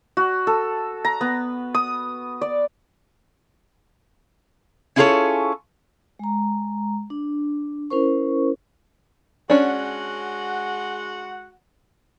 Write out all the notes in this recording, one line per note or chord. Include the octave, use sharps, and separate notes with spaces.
F#4
A4
A#5
B3
D#6
D5
C#4 E4 F4 G#4 A4 C#5
G#3 A#5
D4
C#4 E4 A#4 C5 C#6
G#3 C#4 D4 F#4 F#5